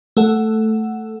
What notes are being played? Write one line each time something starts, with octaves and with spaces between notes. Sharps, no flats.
A3 A4 F#5